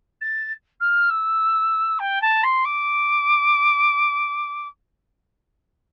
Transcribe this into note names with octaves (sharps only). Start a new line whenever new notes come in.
A6
F6
E6
G5
A5
C6
D6